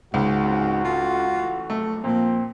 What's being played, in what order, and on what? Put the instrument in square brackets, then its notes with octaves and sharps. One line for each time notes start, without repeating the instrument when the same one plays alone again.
[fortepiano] C#2 [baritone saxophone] G#2 [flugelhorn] F#4
[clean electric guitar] F3 C4 C#4
[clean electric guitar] C#4 E4 A4 [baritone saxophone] F4
[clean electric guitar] E3 A3
[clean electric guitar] C3 F3 F#3 [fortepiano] A3
[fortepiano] A#2 [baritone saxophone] F3 [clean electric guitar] A#3 [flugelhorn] C4